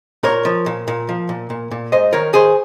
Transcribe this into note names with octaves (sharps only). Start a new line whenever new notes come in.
A#2 A#4 C#5
F3
A#2
A#2
F3
A#2
A#2
A#2
G#2 C5 D#5
D#3 A#4 C#5
D#3 G#4 C5